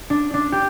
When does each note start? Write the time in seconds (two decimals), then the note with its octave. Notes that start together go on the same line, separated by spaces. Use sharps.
0.10 D4
0.34 D4
0.52 G4